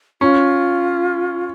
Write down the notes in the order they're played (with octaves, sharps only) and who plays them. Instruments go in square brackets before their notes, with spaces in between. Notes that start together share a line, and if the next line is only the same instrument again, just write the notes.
[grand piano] C#4 [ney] F4